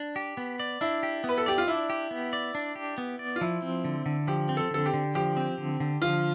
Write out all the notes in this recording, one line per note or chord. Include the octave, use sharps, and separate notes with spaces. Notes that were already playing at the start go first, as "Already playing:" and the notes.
Already playing: D4
G4
B3
D5
D4 E4
G4
B3 B4
A4
G4 D5
F4
D4 E4
G4
B3
D5
D4
G4
B3
D5
F4
F3 E4
C4
D3
D3
F3 G4
C4
A4
D3 A4
G4
D3
F3 G4
C4
D3
D3
F3 F4